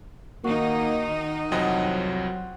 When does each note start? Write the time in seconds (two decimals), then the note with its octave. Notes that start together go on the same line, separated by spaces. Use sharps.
0.44 D#3 A#3 D#4 F#4
1.52 C2 F2 F#3 C4 D#5 F#5 C6